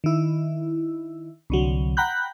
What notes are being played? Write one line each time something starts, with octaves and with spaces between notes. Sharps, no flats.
D#3 E4
C2 D3 F#3
F#5 G5 A#5 B5 F#6 G6